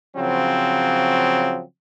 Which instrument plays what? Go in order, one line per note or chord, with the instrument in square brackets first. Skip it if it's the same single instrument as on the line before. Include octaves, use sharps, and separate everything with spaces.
[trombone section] C#3 F3 F#3 C4